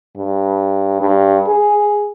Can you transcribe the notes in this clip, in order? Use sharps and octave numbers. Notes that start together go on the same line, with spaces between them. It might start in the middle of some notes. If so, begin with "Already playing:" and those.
G2
G2
G#4